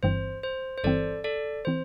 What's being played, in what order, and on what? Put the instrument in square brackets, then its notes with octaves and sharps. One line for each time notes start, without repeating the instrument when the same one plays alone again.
[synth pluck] G1 G2 E3 C4 [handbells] C5
[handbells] C5
C5
[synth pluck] G1 G2 E3 C4 [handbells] A4 D5
[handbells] A4 D5
[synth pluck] E3 C4 [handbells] C5